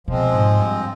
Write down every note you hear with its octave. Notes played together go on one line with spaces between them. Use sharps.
B2 F3 G#3 C4
G#2
G2